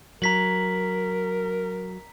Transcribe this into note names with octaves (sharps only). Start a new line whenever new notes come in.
F#3 A#4 A#5 B6 F#7